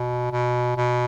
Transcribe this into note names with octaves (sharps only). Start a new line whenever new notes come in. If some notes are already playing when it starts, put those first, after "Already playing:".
Already playing: B2
B2
B2